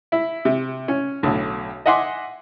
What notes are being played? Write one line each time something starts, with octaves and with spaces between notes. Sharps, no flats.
E4
C3
C#4
B1 A2 D3
D#5 E5 F#5 G#5 C6 D6